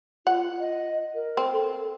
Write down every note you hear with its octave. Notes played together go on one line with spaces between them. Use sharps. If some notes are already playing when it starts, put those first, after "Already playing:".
F4 F#5
D#5
A#4
C4
A4